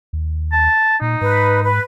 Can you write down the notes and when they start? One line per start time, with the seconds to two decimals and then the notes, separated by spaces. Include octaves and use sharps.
0.13 D#2
0.52 A5
1.01 A#2 D#4
1.21 G#2 B4
1.62 B4